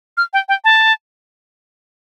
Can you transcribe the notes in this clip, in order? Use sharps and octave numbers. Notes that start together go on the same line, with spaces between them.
F6
G5
G5
A5